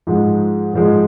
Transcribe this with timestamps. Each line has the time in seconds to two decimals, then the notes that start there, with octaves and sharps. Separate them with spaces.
0.07 G#2 F3 G#3
0.73 G#2 F3 G#3